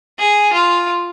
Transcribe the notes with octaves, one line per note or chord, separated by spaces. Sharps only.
G#4
F4